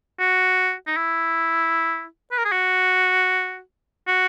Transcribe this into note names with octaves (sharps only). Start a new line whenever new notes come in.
F#4
D#4
E4
B4
A#4
G#4
F#4
F#4